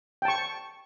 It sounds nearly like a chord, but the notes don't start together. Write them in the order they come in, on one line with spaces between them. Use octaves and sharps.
G5 A5 C#6